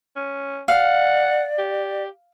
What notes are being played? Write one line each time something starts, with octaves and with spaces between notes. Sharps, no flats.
C#4
D5 F5 F#5
G4